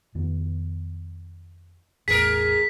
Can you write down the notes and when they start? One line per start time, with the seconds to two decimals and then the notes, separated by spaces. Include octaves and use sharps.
0.15 F2 D#3 B3
2.08 A1 E2 A2 G#4 A#4 B6